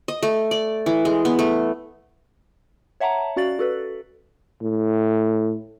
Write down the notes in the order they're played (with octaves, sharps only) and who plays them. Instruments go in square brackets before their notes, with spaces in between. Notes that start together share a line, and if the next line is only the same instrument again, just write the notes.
[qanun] D#5
A3
D5
E3
G#3
B3
A3
[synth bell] C#5 E5 F#5 A5 A#5
C#4 F#4 D5 F5 A6 F#7
F#4 A4 B4
[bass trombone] A2